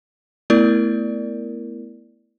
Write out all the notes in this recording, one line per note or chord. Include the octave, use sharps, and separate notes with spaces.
A3 B3 E4 A#4 D5